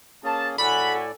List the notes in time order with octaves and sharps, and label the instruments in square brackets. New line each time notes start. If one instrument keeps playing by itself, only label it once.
[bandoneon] A#3 C#4 G#4 [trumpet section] A5
[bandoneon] A2 D5 [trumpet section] F#4 F#5 [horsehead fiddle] A4 G#5 [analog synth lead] B5